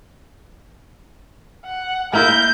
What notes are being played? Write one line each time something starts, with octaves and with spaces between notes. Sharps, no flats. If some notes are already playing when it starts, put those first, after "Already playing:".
F#5
A#3 E4 A#4 G6